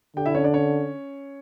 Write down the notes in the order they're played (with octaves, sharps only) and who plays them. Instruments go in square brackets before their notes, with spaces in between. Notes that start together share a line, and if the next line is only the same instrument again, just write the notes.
[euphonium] D3 [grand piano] G4 G5
[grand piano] E4 E5
C#4 C#5
D4 D5
C#4 C#5